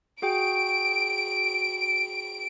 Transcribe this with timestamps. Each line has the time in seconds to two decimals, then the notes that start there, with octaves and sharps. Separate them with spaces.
0.22 F#4 G#4 G5 D7